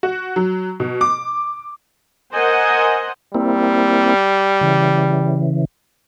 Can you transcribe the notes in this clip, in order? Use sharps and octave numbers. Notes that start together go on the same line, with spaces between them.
F#4
F#3
B2
D6
A#4 C5 D#5 F#5 G#5
G3 A#3 C4 E4
C#3 E3